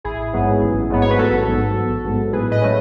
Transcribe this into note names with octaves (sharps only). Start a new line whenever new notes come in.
A1 E4 G#4
G#2 F#3 B3
A1
G#2 F#3 B3
C#5
B4
A1 F#4 A4
G#2 F#3 B3
A1
G#2 F#3 B3
A2 G#4 B4
B4 D#5
F#3 A3 C#4